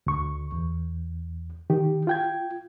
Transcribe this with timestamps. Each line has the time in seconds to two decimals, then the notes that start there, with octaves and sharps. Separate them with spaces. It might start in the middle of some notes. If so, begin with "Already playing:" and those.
0.07 D2 C#6
0.52 E2
1.70 D#3 G4
2.07 F4 G5 G#6